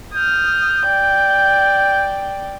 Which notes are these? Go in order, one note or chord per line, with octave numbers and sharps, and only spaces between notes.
D#6 F6 G6
D5 G5